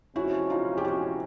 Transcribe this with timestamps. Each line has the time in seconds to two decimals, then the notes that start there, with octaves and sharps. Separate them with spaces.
0.15 C3 F3 G#3 C#4 E4 F#4
0.50 D#4 F4
0.77 G4
0.84 E4 F#4